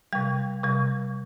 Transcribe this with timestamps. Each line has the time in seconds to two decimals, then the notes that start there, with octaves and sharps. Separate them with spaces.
0.13 C3 G3 G5
0.64 C3 G3